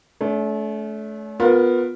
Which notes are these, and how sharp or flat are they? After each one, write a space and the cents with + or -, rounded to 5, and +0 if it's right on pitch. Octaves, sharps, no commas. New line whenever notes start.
A3 -30 C#4 +45
B3 +0 F4 +30 A#4 +0